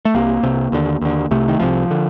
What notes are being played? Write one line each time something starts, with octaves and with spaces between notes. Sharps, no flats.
A3
C2 C3 A#3
C2 C3
D#2 D3
D#2 D3
C2 C3 A3
D#3
C2 C3 F3
D3